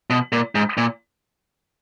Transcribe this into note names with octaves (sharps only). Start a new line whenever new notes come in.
B2
A#2
G#2
A#2